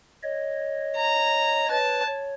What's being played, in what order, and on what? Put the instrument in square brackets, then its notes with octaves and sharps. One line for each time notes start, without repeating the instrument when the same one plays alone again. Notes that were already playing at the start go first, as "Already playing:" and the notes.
[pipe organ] C#5 D#5
[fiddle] A#5
[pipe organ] B4 C#5 [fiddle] A5
[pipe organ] C#5